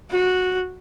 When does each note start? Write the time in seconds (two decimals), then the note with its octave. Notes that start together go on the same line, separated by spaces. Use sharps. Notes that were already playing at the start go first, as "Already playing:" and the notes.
0.11 F#4